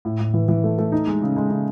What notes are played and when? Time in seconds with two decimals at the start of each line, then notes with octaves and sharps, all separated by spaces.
0.05 A2
0.20 A2
0.34 E3
0.48 E3
0.64 A3
0.78 A3
0.92 D#4
1.07 G#3
1.22 C#3
1.36 G#3
1.50 C#3